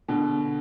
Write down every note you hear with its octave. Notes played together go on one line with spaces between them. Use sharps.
B2 D3